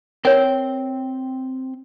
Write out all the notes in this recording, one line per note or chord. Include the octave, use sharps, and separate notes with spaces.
C4 A#4 C#5 G5